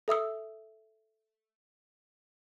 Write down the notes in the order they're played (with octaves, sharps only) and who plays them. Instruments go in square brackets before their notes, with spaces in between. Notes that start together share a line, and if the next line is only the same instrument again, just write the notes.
[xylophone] A4 E5 D#6 E6